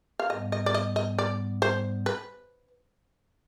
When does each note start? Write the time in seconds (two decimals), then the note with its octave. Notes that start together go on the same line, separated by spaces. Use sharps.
0.19 F5
0.30 G#2 G3 B3 D#5
0.52 D#5
0.66 D5
0.74 D#5
0.96 D#5
1.18 D5
1.62 C5
2.06 B4